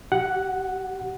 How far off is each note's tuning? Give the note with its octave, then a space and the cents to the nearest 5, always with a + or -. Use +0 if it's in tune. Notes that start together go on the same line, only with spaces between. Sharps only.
G4 -40 F#5 +0